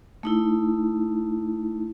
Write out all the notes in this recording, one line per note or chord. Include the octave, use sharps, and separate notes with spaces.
A3 D#4 E4